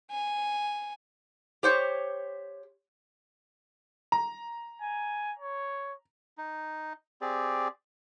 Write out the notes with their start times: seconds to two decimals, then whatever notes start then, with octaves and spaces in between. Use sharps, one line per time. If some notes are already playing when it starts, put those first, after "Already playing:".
0.11 G#5
1.63 G4 C5 C#5
4.12 A#5
4.81 G#5
5.39 C#5
6.38 D#4
7.21 C4 G4 G#4 D5